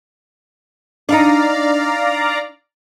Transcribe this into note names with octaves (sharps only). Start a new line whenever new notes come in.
D4 D#4 D5 F5 A#5